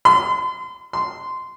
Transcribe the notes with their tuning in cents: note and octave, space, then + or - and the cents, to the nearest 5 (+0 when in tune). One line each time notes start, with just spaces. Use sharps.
C6 -35
C6 -15